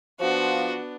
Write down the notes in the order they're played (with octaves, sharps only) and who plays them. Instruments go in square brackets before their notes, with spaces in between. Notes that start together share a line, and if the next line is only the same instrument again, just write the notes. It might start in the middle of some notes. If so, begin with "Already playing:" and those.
[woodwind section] F3 [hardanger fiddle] B3 D4 [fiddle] F#4